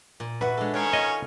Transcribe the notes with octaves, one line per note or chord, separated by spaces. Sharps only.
A#2
F#4 B4 E5 F#5
G#3 D4 A4
D#3 C#4 C#5 G5 C6
F4 C#5 D#5